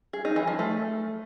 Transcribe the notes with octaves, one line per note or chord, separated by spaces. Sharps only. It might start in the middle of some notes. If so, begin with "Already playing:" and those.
G#4
D#4
E3
F3
A3